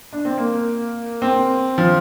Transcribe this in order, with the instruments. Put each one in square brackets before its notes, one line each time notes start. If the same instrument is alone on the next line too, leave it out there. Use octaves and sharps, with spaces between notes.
[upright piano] D4
C4
A#3
C4
F3